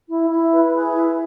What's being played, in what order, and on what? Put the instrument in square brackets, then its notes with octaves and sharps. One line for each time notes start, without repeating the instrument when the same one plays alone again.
[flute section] E4
E4
B4
G#4
E4